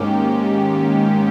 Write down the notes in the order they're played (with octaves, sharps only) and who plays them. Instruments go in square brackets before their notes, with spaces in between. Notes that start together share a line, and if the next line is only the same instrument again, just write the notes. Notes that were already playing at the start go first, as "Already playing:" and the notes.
Already playing: [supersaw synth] G#2 D#3 A#3 C#4 G4